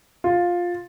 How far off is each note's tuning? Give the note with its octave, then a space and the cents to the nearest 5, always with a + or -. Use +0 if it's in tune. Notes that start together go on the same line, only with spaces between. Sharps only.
F4 +10